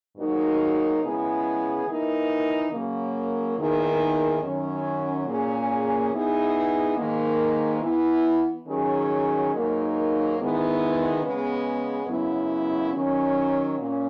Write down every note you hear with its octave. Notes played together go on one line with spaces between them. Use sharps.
G#2 F#3 A#3 D#4 F#4
C#3 G#3 B3 E4 G#4
E3 A#3 D#4
C#3 F#3 A#3
E2 D#3 A#3 D#4 G#4
F#2 D#3 F#3 C#4
A#2 A#3 C#4 G#4
E3 B3 D#4 G#4
G#2 D#3 A#3
E3 B3 E4
D#3 F#3 C#4 G#4
G#2 F#3 A#3 D#4
G#2 D#3 G#3 B3 E4
C#3 G#3 B3
F#2 C#3 F#3 B3 E4
D#3 F#3 C#4
A#2 A#3 C#4